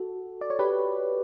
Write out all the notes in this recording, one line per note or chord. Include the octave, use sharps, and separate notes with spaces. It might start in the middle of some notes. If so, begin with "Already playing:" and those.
Already playing: F#4 A4
D5
C#5
G4 B4